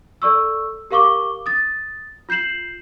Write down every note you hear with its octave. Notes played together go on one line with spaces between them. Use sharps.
A4 D5 C#6 E6
G4 A#4 F5 C#6 D6 G7
D#6 A6
F4 G6 C7 E7 F#7